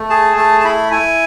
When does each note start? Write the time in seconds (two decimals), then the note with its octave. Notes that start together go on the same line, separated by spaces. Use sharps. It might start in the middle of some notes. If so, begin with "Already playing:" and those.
Already playing: A3
0.10 G#4 A5
0.37 A3 A5
0.60 A5
0.64 E4 B5
0.91 E4 G#5